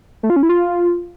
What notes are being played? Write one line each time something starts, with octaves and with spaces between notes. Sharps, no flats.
A3
F4
C#4
E4
F4